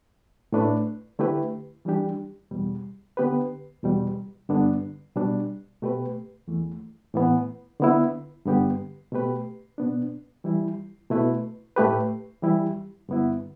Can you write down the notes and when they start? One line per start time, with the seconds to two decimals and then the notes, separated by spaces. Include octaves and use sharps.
0.52 A2 A3 D4 B4
1.19 D3 A3 E4 G4 B4
1.85 E3 G3 D4 G4
2.51 E2 B2 G3
3.17 D3 B3 G4 B4
3.83 E2 B2 G3
4.49 G2 D3 B3 D4
5.15 B2 G3 D4
5.82 B2 A3 G4 B4
6.48 E2 E3 A3
7.14 A2 E3 B3
7.80 D3 B3 E4
8.45 G2 D3 B3 G4
9.12 B2 A3 G4 B4
9.78 B2 B3 D4
10.44 E3 G3 E4
11.10 B2 A3 E4 B4
11.76 A2 A3 G4 B4
12.42 E3 G3 E4 G4
13.09 G2 D3 B3 E4